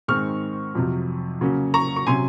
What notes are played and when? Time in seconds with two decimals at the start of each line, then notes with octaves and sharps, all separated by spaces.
0.08 G#2 D#3 G#3 C4 C#6 F6
0.75 F2 C3 F#3
1.41 C#3 F#3 A#3 C#4
1.74 A#5 C#6
1.96 C#6
2.07 C3 F#3 C#4 G#5 C6